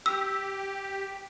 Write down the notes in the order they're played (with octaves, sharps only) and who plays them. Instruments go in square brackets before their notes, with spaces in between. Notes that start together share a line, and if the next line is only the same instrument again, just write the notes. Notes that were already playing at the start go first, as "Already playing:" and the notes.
[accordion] G4 [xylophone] E6